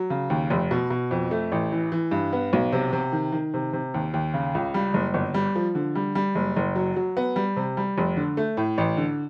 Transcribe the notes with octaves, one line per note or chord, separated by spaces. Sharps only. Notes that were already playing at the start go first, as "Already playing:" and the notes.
Already playing: F#3
C#3
D#2
F1
B2
B2
F2
A3
A1
E3
E3
G2
B3
B1
C3
C3
D#3
D#3
C3
C3
D#2
D#2
C#3
C#2
G3
F#1
G1
G3
F3
D3
G3
G3
F#1
F#1
F#3
F#3
B3
G3
C3
G3
F1
D3
A3
A2
A1
D3